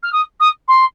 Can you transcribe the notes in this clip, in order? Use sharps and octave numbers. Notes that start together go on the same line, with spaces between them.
F6
D#6
D#6
C6